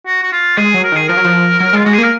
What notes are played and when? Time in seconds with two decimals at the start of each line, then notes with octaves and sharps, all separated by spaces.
0.06 F#4
0.23 F#4
0.32 F4
0.57 G#3 G#4
0.74 F#3
0.84 A#4
0.92 D#3 G#4
1.08 F3 A#4
1.17 F#3
1.25 F3
1.60 F#3
1.73 G#3 F4
1.85 G#3 F#4
1.94 G#4
1.98 A#3 A#4